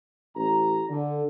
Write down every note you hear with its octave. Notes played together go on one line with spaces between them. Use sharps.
A1 A#5
D3